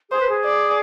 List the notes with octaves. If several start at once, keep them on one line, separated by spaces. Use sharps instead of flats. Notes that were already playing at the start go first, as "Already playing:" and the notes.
G#4 C5
B4
G#4
D5